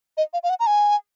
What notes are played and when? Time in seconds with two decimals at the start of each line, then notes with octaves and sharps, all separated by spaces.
0.17 D#5
0.33 F5
0.43 F5
0.50 F#5
0.60 A#5
0.67 G#5